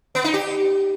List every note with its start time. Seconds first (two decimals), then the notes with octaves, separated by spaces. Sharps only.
0.15 B3
0.24 D#4
0.34 G4